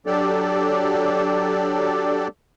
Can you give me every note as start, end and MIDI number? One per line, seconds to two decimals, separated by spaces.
0.06 2.28 54
0.06 2.28 62
0.06 2.28 67
0.06 2.28 69
0.06 2.28 74